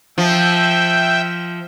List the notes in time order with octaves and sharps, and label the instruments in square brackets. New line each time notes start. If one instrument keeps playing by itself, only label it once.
[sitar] F3 [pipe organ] E5 G5